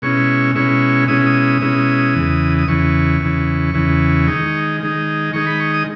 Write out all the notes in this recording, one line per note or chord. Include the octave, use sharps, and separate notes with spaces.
B2 G#3 C#4 E4 C#6
B2 G#3 C#4 E4 C#6
B2 G#3 C#4 E4 D#6
D#6
B2 G#3 C#4 E4
E2 C#3 E3
D#6
E2 C#3 E3 C#6
E2 C#3 E3
E2 C#3 E3
D#3 G#3 D#4
D#3 G#3 D#4
D#3 G#3 D#4 C#6
B5
C#6
D#6